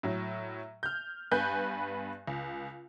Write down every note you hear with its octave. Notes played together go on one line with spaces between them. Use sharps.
A2 F#3
F6 G6
G2 B3 B4 G#5 F#6 G6
C#2